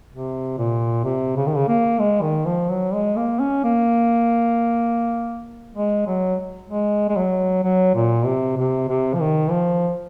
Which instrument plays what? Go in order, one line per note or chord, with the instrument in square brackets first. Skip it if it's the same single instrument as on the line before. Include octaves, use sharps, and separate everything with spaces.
[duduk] C3
A#2
C3
C#3
D#3
C#3
A#3
G#3
D#3
F3
F#3
G#3
A#3
C#4
A#3
G#3
F#3
G#3
G#3
F#3
F#3
A#2
C3
C3
C3
F3
D#3
F3